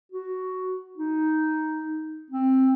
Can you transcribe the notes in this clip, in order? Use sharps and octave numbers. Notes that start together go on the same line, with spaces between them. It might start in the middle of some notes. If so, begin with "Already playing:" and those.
F#4
D#4
C4